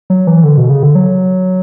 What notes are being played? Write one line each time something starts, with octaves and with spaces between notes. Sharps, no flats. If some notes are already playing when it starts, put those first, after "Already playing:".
F#3
E3
D3
B2
C#3
D3
F#3